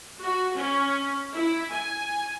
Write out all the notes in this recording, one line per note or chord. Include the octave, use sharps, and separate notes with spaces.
F#4
C#4
E4
G#5